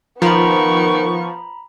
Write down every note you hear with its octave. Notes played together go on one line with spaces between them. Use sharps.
D#3 F3 B3 A#5 B5 C#6